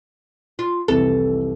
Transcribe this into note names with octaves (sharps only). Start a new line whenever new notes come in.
F4
C2 F2 E3 A4